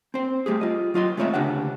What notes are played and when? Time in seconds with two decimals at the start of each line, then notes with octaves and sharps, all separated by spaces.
0.14 C4 C5
0.46 G3 A3 G4 G#4
0.61 F4 D#5
0.94 F#3 F4 D#5 C6
1.17 G#3 A3 C4 C#5 D#5 E5
1.34 D2 C#3 D4 G4 B4 F#5